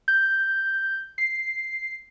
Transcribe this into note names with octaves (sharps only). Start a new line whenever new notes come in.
G6
C7